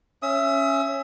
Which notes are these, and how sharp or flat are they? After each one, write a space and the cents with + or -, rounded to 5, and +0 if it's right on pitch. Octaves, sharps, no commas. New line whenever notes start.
C#4 -5 E5 +20 D#6 +40